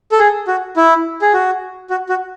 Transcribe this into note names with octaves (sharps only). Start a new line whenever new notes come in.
A4
G#4
F#4
E4
G#4
F#4
F#4
F#4